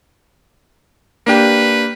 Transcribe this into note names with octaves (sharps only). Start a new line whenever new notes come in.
A#3 D4 G4 B4